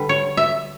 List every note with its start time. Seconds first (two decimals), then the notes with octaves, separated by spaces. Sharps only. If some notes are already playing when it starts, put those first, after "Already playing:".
Already playing: D3 G3 B4
0.09 C#5
0.37 E5